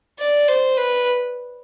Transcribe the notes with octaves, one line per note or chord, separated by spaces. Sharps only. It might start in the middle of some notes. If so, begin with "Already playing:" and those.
D5
C5
B4